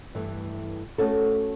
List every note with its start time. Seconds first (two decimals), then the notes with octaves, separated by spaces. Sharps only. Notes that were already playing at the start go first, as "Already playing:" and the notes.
0.15 G2 E3 A3
0.98 A3 C#4 F#4 A4